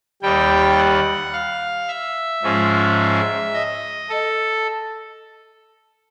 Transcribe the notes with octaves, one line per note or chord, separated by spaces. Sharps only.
D#2 D#3 G3 G5
F#5
F5
E5
G#2 F3 G#3 C#4
D#5
A4